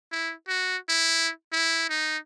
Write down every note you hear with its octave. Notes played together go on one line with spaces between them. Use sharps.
E4
F#4
E4
E4
D#4